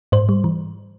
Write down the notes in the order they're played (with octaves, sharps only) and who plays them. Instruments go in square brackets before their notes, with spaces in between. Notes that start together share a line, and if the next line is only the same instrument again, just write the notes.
[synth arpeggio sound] G#2 C5
G3
E3